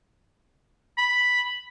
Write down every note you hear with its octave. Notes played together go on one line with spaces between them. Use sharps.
B5